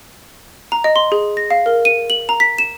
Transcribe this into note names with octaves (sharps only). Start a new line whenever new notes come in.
A#5
D#5
C6
G#4
A#6
F5
A#4
D#7
F#7
A#5
B6
E7